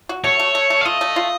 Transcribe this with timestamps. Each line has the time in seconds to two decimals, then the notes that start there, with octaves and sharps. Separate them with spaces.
0.09 F#4
0.24 A3 C#5
0.39 A3
0.55 A3
0.70 A3
0.81 F5
0.85 F4 D#5
1.01 A3
1.16 F4